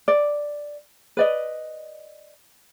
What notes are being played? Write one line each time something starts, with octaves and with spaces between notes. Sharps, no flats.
D5
B4 D5 D#5